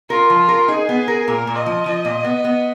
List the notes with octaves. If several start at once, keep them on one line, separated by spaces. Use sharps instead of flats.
F4 A#4
F3
A#4
D#4 G#4
B3
A#4
A#2 A#4
A#2
D#5
F3
F3
A#2
B3
B3